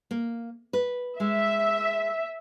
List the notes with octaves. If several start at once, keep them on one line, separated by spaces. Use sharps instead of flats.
A#3
B4
G#3 E5